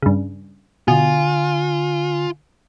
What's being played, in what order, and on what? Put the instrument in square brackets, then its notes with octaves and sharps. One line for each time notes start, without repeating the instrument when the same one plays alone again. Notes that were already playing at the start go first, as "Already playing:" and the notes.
[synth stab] G2 C#3
[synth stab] B2 [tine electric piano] D3 G#5 [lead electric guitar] F4